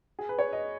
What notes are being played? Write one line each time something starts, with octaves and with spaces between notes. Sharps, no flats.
G#4
B4
C#5
D#5